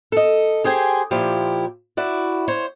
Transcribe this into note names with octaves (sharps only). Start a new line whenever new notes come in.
A4 D#5
G4 G#4 C5 G5 G#5
A#2 F3 E4 G4
E4 F#4 D5
C5 C#5